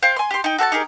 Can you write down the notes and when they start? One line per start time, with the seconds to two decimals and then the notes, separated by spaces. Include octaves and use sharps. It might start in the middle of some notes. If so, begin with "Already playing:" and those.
0.03 C5 F5 G5
0.16 G#5 C6
0.31 G4 C6
0.44 D#4 G5
0.58 F#4 A4 G5 A5
0.72 D#4 G4 G#4 A#4